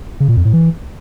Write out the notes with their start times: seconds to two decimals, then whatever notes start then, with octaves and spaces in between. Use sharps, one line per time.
0.20 C#3
0.28 A#2
0.37 F2
0.45 A2
0.53 E3